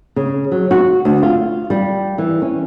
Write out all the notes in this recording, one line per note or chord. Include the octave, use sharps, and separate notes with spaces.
C#3
F#3
F#4
D2
F4
G3
E3
C#4